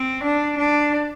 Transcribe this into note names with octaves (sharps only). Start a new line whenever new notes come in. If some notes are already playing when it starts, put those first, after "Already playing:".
Already playing: C4
D4
D4